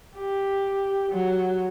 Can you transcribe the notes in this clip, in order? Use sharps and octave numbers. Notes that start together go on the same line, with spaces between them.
G4
F#3